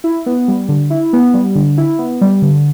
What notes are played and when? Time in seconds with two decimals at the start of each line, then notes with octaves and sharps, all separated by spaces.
0.04 E4
0.26 B3
0.48 G3
0.69 D3
0.90 E4
1.13 B3
1.34 G3
1.55 D3
1.78 E4
1.99 B3
2.21 G3
2.42 D3